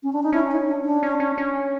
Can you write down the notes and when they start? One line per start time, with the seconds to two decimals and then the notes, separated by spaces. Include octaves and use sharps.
0.03 C#4
0.13 D4
0.23 D#4
0.32 C#4 E4
0.50 D#4
0.68 D4
0.85 D4
1.03 C#4
1.20 C#4
1.38 C#4